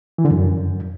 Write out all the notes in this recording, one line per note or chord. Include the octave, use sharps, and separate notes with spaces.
E3
D3
F#2